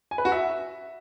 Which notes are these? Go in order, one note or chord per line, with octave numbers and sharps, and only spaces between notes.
G#5
B4
F#4
E5